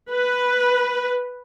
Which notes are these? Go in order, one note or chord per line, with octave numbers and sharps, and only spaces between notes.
B4